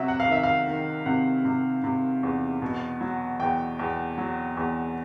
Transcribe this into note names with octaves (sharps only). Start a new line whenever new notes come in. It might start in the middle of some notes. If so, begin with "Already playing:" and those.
Already playing: C3 F#3 E5
F#5
F5
D#3 E5
F5
D#3
C3 F#5
C3
C3
E2
B2
F#3
E2 G5
E2
F#3
E2